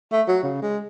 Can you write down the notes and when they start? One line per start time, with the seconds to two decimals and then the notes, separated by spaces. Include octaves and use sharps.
0.12 A3
0.28 F#3
0.43 C#3
0.62 G#3